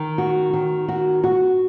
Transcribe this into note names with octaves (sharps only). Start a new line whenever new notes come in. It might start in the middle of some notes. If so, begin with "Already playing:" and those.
Already playing: D#3
F#4
D#3
F#4
F#4